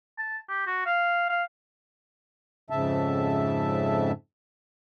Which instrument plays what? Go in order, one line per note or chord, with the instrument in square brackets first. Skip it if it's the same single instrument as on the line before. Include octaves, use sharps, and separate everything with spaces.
[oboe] A5
G4
F#4
F5
F5
[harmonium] F2 G#2 C#3 E5 A5